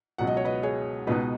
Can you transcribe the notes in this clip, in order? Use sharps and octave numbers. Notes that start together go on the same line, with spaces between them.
C#2 B2 F#3 F#5
D#5
C#5
B4 D#5
G#4 C#5
C#2 B2 B3 D#4 B4 D#5